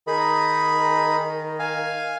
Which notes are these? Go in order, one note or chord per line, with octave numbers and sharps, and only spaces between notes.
D#3 D#4 G#4 B5
F5 G#5